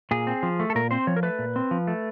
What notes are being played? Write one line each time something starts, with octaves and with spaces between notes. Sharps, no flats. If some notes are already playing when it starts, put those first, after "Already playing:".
A#2 G#4
C4
F3
A3
A4
A#2 A#4
C4 C5
F3 C#5
A#4
A3 B4
A#2
C4
F3
A3